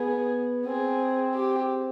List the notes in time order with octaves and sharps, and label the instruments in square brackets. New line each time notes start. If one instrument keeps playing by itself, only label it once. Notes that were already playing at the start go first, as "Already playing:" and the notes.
Already playing: [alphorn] B3 [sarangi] G#4
[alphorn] C4 [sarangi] G#4
[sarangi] G4